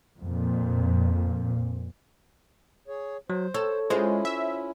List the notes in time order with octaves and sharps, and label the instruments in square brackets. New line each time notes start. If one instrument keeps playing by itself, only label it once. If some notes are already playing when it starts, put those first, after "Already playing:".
[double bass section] F2 A#2
[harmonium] G#4 C#5
[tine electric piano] F#3 [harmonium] C5
[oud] A4 [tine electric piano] C#5
[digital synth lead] G#3 [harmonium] C#4 E4 [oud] F4 C5
[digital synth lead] E5